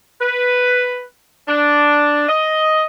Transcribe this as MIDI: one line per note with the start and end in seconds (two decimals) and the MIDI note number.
0.21 1.03 71
1.48 2.25 62
2.29 2.86 75